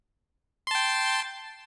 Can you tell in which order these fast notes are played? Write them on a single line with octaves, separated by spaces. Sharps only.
C6 A5 G5